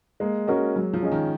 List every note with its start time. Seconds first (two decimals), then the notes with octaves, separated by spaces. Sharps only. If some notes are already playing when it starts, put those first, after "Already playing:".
0.20 G#3 A#3
0.47 G#3 C#4 F#4 A#4 D#5
0.76 F#3
0.93 F3
1.02 C#4 G#4 D#5
1.12 D#3